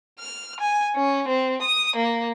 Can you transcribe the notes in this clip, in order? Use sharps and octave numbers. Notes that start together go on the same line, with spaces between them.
F6
G#5
C#4
C4
D#6
A#3